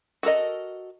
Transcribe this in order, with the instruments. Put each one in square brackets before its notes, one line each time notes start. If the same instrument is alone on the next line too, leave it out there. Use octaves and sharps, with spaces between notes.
[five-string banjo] F#4 A4 A#4 D#5